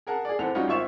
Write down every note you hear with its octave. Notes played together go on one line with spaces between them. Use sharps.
G#4 A#4 F#5 A5
G#4 D5
E2 C4 A4 F#5 F7
G3 C#4 D#4 F4 F#4
G#1 C4 F4 E5 C#6 E7